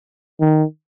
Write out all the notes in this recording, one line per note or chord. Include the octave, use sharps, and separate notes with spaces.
D#3